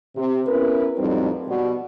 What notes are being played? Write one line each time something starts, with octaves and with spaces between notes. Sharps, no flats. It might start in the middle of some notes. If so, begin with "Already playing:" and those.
C3
B3 C#4 E4 A#4 B4
F2 A2 F#3 G3 C4 D#4
B2 G3